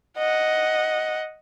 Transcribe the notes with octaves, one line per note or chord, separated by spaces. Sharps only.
D#5 F#5